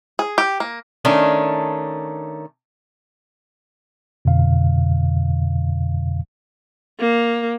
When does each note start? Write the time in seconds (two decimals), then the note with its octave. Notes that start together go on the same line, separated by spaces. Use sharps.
0.19 G#4
0.38 G4
0.60 A#3
1.05 D#3 A3 C#4 D4
4.25 F2 B2 D3 F5
6.99 A#3